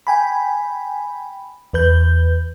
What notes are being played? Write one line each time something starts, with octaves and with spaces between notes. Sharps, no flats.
G5 G#5 B5
E2 B4 G6